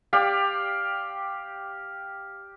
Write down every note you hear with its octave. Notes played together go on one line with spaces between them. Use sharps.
G4 D5 F5 G5